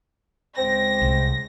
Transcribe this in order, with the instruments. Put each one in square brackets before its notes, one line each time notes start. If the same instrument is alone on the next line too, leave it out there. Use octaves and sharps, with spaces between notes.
[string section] C#2 A#6 [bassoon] C4
[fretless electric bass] C2